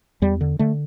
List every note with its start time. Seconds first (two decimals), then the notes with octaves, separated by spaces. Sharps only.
0.22 E2 G3
0.41 D3
0.59 D3 A3